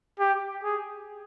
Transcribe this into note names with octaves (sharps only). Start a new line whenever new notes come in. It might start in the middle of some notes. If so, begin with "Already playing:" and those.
G4
G#4